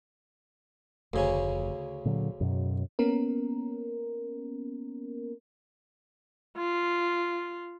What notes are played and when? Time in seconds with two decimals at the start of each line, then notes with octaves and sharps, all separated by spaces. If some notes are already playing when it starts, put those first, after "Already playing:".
1.14 F1 D2 C#3 C#4
2.05 A#2 D3 F#3
2.40 F#2 B2 F#3
2.99 A#3 B3 C#4 A#4
6.57 F4